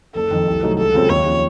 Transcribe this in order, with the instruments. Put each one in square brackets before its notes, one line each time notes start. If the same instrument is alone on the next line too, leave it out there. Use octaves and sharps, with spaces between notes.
[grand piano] F#1 [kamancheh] A4
[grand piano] F2 D#3
C2
C3 F#3 A3 D#4
[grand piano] C#2 [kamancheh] A4
[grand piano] C#3 F#3 C4 F4
[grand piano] D#2 [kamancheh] C#5
[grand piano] C#3 F3